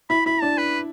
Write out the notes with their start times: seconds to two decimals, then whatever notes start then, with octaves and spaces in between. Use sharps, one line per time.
0.10 E4 B5
0.26 E4 B5
0.42 D4 A5
0.58 B4